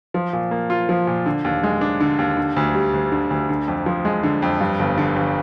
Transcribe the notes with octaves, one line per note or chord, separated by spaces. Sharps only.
F3
A#2
A#3
F4
F3
A#2
D3
D#2
G#3
D4
D3
D#2
D3
D2
G3
D2
D3
D2
D3
F2
F3
G#3
D3
F2
G2
G1
D3
G1